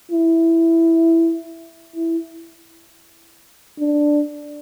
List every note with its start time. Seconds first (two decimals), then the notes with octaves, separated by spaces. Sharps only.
0.12 E4
1.96 E4
3.79 D4